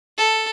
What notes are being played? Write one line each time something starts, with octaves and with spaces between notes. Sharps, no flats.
A4